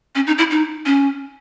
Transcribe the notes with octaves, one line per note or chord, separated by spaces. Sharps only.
C#4
D#4
E4
D#4
C#4